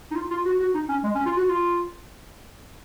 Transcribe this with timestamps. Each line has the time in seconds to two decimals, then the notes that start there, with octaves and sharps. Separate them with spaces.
0.11 D#4
0.15 F4
0.30 F4
0.45 F#4
0.60 F#4
0.75 D#4
0.89 C#4
1.04 G#3
1.15 C#4
1.26 F4
1.37 F#4
1.48 F4